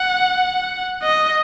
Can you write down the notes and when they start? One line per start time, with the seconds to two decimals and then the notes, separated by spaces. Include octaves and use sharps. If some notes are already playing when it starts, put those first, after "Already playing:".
Already playing: F#5
1.03 D#5